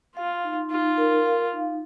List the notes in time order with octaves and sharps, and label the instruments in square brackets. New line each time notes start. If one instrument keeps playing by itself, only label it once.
[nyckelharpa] F4 [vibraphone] F5
[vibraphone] D#4
[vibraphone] D#4 [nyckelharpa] F4
[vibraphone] A#4
F5
D#4